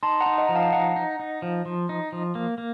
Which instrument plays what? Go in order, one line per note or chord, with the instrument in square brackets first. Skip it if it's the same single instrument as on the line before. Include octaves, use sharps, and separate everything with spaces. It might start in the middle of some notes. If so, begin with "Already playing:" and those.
[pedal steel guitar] D#4 [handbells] A5 C6
[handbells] F#5 A#5
[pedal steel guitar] D#4
[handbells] D#5 F#5
[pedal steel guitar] F3 [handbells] A#5
[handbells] F5 A5
[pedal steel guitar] D#4 [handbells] F#5 A#5
[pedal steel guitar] D#4
D#4
F3
F3
D#4
F3
A#3
A#3